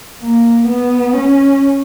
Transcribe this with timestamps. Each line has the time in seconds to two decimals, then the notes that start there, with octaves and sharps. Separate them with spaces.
0.21 A#3
0.67 B3
1.13 C#4